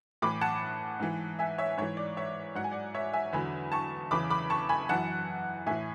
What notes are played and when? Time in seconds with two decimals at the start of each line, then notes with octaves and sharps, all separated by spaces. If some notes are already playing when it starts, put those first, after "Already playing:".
0.22 A2 E3 B5 D6
0.41 F#5 A5
1.00 G#2 E3
1.39 E5 G#5
1.58 C#5 E5
1.78 G#2 E3 C#5
1.97 D5
2.17 C#5 E5
2.55 G#2 F#3 F#5
2.64 G#5
2.71 D5 F#5
2.94 C#5 E5
3.13 E5 G#5
3.33 E2 D3 F#3 G#5 B5
3.72 A5 C#6
4.11 E2 C#3 E3 B5 D6
4.30 B5 D6
4.50 A5 C#6
4.69 G#5 B5
4.89 F#2 E3 F#5 A5
5.66 A2 E3 E5 G#5